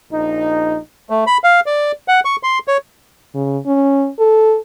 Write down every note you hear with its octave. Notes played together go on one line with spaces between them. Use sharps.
A#1 D#4
A3
B5
F5
D5
F#5
C#6
C6
C#5
C#3
C#4
A4